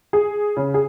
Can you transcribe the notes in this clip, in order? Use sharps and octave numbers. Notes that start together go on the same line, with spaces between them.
G#4
C#3
G#4